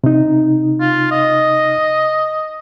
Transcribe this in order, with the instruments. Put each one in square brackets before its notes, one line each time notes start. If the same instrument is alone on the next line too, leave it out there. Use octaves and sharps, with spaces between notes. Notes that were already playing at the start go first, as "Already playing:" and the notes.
[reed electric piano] C3 D#4
[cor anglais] F4
D#5